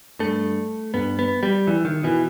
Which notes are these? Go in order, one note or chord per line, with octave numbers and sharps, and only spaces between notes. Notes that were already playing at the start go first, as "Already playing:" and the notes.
G2 A3
G2 B3
B3
G3
E2 E3
D#3
B2 E3